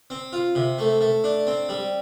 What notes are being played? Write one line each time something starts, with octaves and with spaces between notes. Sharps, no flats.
C4
F4
C3
A3
A3
D4
C4
G3